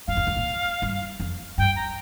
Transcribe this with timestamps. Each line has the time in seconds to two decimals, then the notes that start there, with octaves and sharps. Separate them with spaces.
0.07 G2 F5
0.17 F2
0.27 G2
0.36 A#2
0.82 G2
1.20 F2
1.58 G2 G5
1.76 A#5